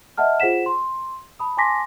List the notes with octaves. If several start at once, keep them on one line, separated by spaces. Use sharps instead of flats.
D#5 E5 F#5 A5 F6
F4 G#4 C5 F#5 B6 E7
C6
A5 B5 D#6
G#5 A5 C6 D6 A#6 B6